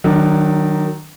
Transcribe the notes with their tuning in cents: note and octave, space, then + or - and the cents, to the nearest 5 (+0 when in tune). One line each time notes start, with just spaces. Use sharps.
D#3 -10 F#3 +15 D4 +15